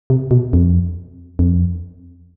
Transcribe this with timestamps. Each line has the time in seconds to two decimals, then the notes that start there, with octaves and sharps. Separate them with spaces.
0.10 C3
0.31 B2
0.53 F2
1.39 F2